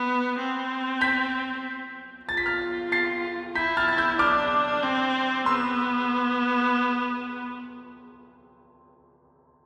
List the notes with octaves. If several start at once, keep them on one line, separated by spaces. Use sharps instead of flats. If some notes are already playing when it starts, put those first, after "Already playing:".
Already playing: B3
C4
G6 B6
F4 A6
B6
F6 A6
A6 C7
E4 G6 B6
F6 A6
A6
E6 G6
D4 D6 F6
C4
B3 C6 E6